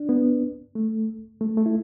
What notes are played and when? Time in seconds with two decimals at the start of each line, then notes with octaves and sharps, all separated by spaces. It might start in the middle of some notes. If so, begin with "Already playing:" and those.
Already playing: D4
0.09 B3
0.75 A3
1.41 A3
1.57 A3
1.66 E4